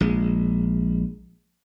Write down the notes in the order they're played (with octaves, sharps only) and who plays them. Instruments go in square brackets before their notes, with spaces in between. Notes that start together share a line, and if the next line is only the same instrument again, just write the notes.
[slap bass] A#1 G#3